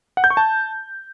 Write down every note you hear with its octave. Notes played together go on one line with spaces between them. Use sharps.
F#5
G6
C#6
A5